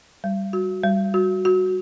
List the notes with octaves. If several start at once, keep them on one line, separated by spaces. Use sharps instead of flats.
G3
F#4
G3
F#4
F#4